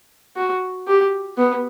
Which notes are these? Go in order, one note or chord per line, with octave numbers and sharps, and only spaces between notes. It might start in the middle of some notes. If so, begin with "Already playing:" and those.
F#4
G4
B3